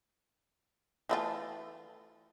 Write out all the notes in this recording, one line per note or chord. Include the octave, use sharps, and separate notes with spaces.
E3 A3 F4